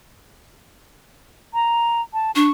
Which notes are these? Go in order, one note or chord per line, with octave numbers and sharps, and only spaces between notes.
A#5
A5
D4 C#6